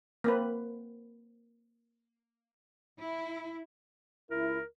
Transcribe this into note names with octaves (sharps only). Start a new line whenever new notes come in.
A#3 C4 B4
E4
C#2 E4 A#4